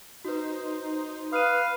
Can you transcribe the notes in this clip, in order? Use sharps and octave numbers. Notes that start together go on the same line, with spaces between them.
D#4 F#4 B4 C5
B4 F5 D#6 F#6 D#7